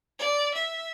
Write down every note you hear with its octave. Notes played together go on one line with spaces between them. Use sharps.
D5
E5